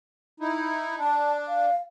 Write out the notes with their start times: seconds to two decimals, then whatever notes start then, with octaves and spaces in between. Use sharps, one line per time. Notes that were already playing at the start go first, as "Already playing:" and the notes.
0.40 D#4 E4
0.99 D4 A5
1.48 F5